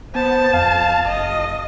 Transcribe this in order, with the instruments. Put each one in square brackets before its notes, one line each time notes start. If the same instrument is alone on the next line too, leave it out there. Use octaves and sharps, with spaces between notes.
[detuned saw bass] B3 [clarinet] C5 [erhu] A5
[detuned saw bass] F2 [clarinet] F5
[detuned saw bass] F#1 [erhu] D#5